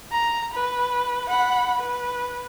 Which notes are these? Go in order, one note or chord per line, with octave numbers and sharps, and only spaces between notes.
A#5
B4
F#5 B5
B4